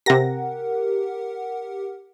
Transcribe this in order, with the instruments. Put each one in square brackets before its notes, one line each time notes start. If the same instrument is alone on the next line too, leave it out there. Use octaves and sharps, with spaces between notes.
[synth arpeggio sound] C3 A#6 [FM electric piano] G4 A#4 F#5